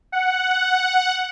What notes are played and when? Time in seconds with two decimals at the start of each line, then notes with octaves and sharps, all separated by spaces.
0.12 F#5